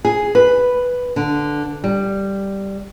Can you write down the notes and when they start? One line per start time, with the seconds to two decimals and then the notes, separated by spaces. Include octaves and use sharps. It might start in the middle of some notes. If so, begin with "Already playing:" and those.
0.05 G#4
0.35 B4
1.16 D3
1.84 G3